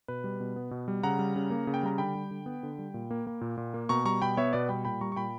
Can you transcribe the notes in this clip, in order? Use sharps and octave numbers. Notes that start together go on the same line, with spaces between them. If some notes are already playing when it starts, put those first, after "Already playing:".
B2 B4
G3
B2
B3
B2
G3
C#3 F#5 A#5
G3
C#3
A#3
C#3
G5
G3 A#5
D3 G5 B5
G3
D3
B3
D3
G3
A#2
A#3
A#3
A#2
A#2
A#3
B2 A#5 C#6
G3 A#5 C#6
B2 G5 B5
B3 C#5 E5
B2 B4 D5
G3 G5 B5
A#2 G5 B5
G3 A#5 C#6
C#6
A#2 G5 B5